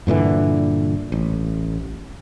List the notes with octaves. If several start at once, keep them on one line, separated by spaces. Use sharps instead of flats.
G2 A#2 D3 E3
A1